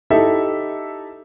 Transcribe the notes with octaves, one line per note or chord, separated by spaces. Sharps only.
D#4 E4 G4 A4 E5